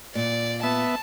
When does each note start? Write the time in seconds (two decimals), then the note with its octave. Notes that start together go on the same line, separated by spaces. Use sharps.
0.15 A#2 D5
0.63 B3 E5 A5